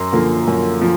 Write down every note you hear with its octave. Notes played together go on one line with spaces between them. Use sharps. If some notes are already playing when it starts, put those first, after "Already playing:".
Already playing: F#2 A#5 C6
D3 F3 A#3
F#2
F3